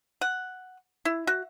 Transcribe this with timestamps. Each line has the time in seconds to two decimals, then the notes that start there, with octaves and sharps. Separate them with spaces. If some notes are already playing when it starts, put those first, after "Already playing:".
0.21 F#5
1.05 E4
1.27 F#4